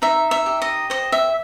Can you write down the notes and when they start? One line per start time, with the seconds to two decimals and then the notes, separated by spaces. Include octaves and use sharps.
0.02 D#4 E5
0.31 E5
0.46 G4
0.62 D#5
0.90 C5 D#5
1.12 E5